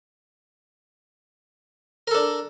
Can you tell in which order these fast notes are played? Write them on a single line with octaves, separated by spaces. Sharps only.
A#4 A4 D4